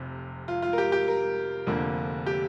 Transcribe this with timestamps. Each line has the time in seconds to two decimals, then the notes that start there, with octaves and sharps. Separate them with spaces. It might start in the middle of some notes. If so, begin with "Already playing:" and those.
Already playing: F1 F2 C3
0.48 F4
0.62 F4
0.73 A#4
0.78 G4
0.92 G4
1.08 A#4
1.66 F1 F2 D3 A#3
2.26 G4